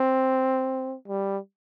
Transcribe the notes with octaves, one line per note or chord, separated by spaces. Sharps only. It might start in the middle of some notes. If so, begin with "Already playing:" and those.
Already playing: C4
G3